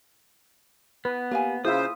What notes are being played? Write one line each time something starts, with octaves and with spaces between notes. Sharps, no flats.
B3 B4
A#3 G4 F5 G#5
C#3 E4 F4 G#4 C5 E5 D#6